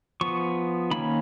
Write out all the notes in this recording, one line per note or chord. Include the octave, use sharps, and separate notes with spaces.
F3 B3 C#6
D#3 A#3 C#4 B5